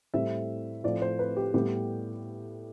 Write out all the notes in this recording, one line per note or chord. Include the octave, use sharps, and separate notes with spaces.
A2 G3 C4 E5
A2 F3 C4 D5
C5
B4
G4
A2 G3 B3 G4